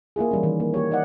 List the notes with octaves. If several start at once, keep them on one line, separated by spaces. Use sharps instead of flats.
A#3 E4 F4 G#4
E3 G3 C#4
D#3 E3
A#3
A#3 G4 C#5
D#4 D5 D#5 F#5